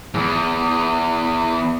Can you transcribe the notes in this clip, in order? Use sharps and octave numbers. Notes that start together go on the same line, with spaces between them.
E2 G#2